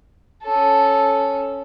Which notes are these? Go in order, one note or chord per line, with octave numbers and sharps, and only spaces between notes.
C#4 A4